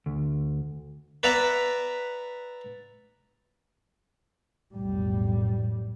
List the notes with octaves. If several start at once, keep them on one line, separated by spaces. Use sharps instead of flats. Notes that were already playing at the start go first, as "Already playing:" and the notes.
D2
B4 D5 E5 F#5 A#5
B1 F2 A2 G3